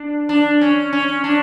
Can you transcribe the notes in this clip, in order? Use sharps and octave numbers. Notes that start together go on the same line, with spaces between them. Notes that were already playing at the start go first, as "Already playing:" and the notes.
Already playing: D4
D4
C#4
C#4
D4